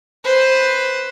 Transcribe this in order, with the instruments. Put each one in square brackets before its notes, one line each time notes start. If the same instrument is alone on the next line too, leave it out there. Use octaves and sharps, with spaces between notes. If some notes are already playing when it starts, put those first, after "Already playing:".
[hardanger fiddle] B4 C5